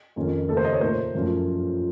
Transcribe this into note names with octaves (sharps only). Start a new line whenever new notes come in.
F2 D#3 A#3 C#4 F4
D#2 C#3 A3 D#4 A4
C5
D#5
C#5
A#2 A3 D#4 C5
F#2 F3 A3 C#4 F4